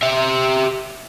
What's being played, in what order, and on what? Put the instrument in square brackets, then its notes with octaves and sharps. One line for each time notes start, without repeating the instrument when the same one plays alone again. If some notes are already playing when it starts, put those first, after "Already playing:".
[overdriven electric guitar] G4 E5